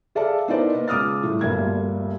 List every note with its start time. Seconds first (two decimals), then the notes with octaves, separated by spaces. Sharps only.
0.15 G#4 A4 D5 E5 F5 A5
0.48 B3 D#4 E4 A#4 C5 D5
0.74 A#3 A#4 B4
0.88 C#2 D6 D#6 F6 A6
1.23 A2 G3 A3
1.41 G1 D2 A#2 G3 A#3 G#6